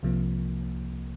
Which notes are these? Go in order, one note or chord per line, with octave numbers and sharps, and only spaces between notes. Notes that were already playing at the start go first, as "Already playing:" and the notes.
C2 C3 F3 A#3